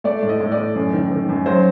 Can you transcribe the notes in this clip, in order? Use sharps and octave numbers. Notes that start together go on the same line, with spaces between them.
A3 D5
A2
D#5
A2
D5
A2
F#2
D#3
D#3
F#2
F#3 C5